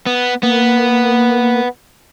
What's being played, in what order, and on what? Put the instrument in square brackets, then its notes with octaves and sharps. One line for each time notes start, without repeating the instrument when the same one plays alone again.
[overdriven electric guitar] B3
[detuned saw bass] A#3 [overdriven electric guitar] B3